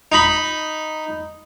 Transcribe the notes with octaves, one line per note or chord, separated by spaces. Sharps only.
D#4 B5